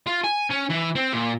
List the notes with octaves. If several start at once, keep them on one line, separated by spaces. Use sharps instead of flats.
F4
G#5
C#4
E3
C4
A#2